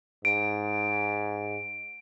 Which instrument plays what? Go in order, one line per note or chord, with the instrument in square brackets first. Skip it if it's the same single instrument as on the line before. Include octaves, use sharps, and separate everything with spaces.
[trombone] G#2 [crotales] D7